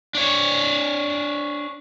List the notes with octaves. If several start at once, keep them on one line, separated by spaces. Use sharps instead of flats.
D4 C#5